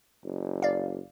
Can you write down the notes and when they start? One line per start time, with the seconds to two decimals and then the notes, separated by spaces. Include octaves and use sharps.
0.24 F#1
0.62 D5 F5